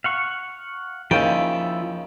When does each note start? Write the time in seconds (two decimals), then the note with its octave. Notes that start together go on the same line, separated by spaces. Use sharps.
0.04 F5 F#5 C#6
1.11 D#2 C#3 F3 E4 G5